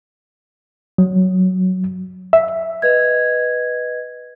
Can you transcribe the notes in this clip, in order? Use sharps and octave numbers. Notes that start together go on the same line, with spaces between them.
F#3
E5
B4 D#5 G#6